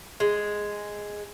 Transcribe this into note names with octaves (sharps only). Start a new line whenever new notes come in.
G#3